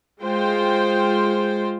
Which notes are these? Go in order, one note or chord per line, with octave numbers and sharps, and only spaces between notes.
G#3 F4 C5 G5